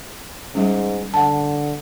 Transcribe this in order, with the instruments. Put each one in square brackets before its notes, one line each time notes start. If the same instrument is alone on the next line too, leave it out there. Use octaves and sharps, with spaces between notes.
[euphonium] G#2 [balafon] G3 C#4
[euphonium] D3 [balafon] F#5 A5